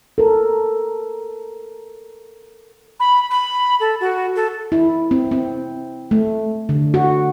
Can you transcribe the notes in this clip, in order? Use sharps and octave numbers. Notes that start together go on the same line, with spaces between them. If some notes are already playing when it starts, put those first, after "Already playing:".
A4 A#4
B5
B5
A4
F#4
A4
E4
C4
C4
A3
D3
F#4